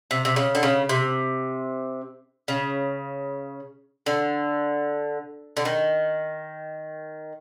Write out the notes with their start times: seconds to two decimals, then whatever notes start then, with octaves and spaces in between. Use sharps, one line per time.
0.11 C3
0.25 C3
0.36 C#3
0.55 D3
0.63 C#3
0.89 C3
2.48 C#3
4.06 D3
5.57 D3
5.65 D#3